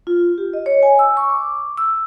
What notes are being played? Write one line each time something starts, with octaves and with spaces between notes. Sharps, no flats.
F4
G4
D#5
C#5
G#5
E6
C#6
D6
E6